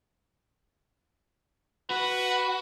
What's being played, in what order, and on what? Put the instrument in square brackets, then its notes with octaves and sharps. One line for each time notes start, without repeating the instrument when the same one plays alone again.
[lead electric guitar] F#4 [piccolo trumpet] B4